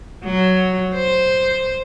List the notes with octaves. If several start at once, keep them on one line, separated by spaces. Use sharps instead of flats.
F#3
C5